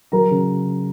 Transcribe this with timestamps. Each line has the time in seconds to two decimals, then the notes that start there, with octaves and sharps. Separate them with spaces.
0.12 F#3 A#4 A#5
0.31 C#3